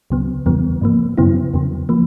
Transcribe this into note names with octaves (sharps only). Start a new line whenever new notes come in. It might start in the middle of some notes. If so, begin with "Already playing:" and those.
C#2 C#3 F#3 B3
E2 C#3 E3 G3 B3
G#2 F3 A#3
F#2 C#3 F#3 B3 E4
E2 C#3 F#3
F3 A#3